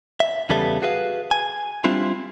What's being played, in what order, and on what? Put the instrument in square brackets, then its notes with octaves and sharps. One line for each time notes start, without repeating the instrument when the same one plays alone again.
[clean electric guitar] E5
E2 C#3 G3 B3 A4 E5
F#4 G#4 B4 E5 F5
G#5
G3 C4 D4 E4 F4